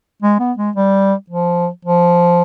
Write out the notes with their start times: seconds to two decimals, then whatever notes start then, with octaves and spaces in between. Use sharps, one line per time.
0.22 G#3
0.40 B3
0.58 G#3
0.76 G3
1.30 F3
1.85 F3